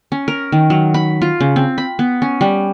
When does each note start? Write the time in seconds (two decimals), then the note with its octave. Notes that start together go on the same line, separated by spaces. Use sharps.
0.12 C#4
0.28 A#4
0.52 D#3
0.70 F#3
0.94 B5
1.22 F4
1.40 C#3
1.56 C4
1.78 B5
1.99 B3
2.22 C#4
2.41 G3